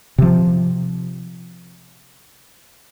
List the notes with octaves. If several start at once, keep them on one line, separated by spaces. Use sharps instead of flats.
C3 F3